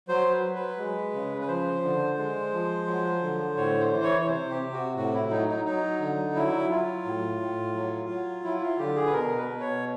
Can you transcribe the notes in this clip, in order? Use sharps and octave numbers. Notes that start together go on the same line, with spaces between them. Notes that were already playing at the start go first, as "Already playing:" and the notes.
F#3 C5
B4
F#3
B4
G#3
C#3
B4
F3 C5
D3
G#3
F3
F#3
D3
A2 C#5
C5
E3
C#5
C#5
C3 C5
G4
C3
F#4
A2 F#4
E4
F#3 D#4
D#4
F#3 D#4
D3
F#3 E4
F#3 F4
A2
A2
F#3
F#3
F#3 E4
F4
D3 G4
G#4
B4
B2 A#4
B4
B2
C#5